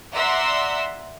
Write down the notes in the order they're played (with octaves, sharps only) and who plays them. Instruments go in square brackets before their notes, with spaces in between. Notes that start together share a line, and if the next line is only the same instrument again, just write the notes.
[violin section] D5 E5 F#5 A#5 C6 E6